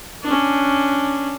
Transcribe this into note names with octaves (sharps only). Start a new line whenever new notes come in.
C#4 D4